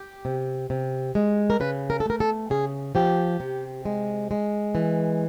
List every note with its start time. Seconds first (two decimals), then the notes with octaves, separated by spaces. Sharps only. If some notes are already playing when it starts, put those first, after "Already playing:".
Already playing: G4
0.25 C3
0.70 C3
1.15 G#3
1.50 A#4
1.60 C#3 B4
1.90 A#4
2.00 A4
2.06 A3 A#4
2.20 A4
2.50 C#3 G#4
2.95 F3 G4
3.40 C3
3.85 G#3
4.31 G#3
4.75 E3